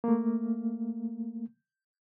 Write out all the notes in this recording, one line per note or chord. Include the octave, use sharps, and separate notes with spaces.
A3 A#3